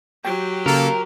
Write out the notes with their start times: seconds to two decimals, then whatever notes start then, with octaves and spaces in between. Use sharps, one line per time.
0.25 F#3 G4 G5
0.66 C#3 A#3 A4 A#4